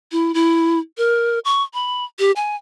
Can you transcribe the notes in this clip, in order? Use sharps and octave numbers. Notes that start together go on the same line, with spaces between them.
E4
E4
A#4
C#6
B5
G4
G#5